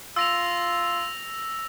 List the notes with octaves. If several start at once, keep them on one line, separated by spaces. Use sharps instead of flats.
F4 E6 A#6 F7